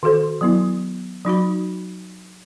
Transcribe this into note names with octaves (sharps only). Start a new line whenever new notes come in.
D#3 F#4 A4 C5
F#3 B3 E4
F#3 D#4 F#4 B5